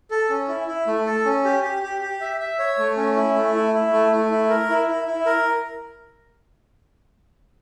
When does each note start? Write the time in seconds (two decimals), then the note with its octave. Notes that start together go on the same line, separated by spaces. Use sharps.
0.11 A4
0.30 C#4
0.48 E4
0.68 E4
0.87 A3
1.06 A4
1.25 C#4
1.45 G4
1.64 G4
1.83 G4
2.01 G4
2.21 E5
2.40 E5
2.59 C#5
2.78 A3
2.97 C#4
3.16 E4
3.36 A3
3.55 E4
3.74 E4
3.93 A3
4.12 A3
4.31 E4
4.50 A#4
4.70 E4
4.89 E4
5.07 E4
5.26 A#4